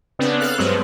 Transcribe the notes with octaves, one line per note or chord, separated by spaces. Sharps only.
C#3 B3 C4 D4
A4 F5 F#6
G2 F#3 G#3 B3 C4